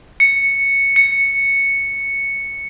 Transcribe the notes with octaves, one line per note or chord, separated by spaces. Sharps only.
C#7
C#7